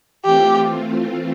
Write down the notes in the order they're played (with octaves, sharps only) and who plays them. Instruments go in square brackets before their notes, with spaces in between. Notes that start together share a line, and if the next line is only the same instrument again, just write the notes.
[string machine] E3 A3 C4 F4 [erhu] G4